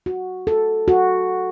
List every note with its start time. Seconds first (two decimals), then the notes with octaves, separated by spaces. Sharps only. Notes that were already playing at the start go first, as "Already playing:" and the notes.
0.06 F#4
0.47 A4
0.88 F#4